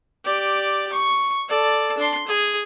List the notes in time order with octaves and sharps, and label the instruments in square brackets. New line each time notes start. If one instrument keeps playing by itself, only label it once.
[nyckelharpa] G4 D5
C#6
A4 D5
D4 C6
G#4